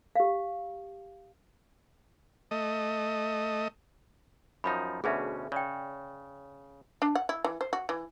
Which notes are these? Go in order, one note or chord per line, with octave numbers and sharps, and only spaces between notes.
G4 F5
A3 D#5
F#2 F3 D#4 B5
D2 B2 C#4 G#4 A#4 E5
C#3 D5 G5
D4
F#5
E4
E3
C5
F#4
E3